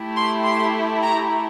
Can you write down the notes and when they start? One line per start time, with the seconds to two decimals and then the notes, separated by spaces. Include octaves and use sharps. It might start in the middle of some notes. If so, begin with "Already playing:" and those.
Already playing: A3 E4 G4
0.16 C6
0.44 C6
1.03 A#5